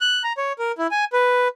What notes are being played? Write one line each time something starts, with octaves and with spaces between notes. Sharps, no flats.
F#6
A#5
C#5
A#4
E4
G#5
B4